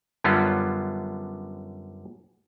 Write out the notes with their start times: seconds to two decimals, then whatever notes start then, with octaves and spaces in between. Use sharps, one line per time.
0.24 F#2 D3 G3 B3 C#4 F4